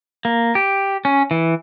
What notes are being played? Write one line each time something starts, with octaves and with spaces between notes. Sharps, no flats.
A#3
G4
C#4
E3